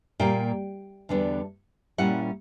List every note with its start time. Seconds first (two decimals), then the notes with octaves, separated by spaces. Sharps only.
0.20 A#2 G3 A#3 G5
1.09 E2 D3 G3 B3 D4
1.98 A#2 G3 C#4 E4 F#5